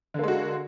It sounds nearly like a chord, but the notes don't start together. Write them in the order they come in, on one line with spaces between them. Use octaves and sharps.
D3 A#3 G#3 F#4